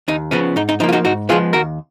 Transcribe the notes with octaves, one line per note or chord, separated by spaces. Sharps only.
D#2 D#4
C#3 F3 B3 C#4
G#2 D#4
D#4
F3 A#3 D#4
F4
D#4 F#4
G#2 D#4 F#4
F3 G#3 B3 F4 G#4
D#2 F#4 A#4